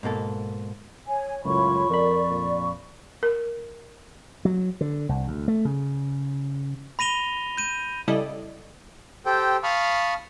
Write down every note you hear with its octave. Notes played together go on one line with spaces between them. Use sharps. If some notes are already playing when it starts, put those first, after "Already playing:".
G#2 B2 A#3 A4
C#5 G#5
C#2 F#2 A2 F4 C#5 B5 C#6
F2 A#4 D5 B5
A#2
A#4
F#3
D3
C2
D2
A3
C#3
B5 A#6 D#7 F7 G7
G6 D#7
C#3 G3 E4 A4 D5 D#5
G4 A4 C5 G5
F5 A5 B5 C#6 D#6 F6